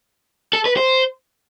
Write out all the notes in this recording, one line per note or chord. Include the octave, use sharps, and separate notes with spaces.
A4
B4
C5